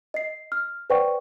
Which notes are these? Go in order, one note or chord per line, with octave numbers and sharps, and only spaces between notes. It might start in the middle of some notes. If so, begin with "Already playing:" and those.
D#5 C7
F6
B4 C5 D5 F#5 G5 C#6